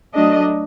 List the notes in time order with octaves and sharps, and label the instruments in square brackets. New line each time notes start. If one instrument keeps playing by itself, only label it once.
[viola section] F#3 A3 D4 D#5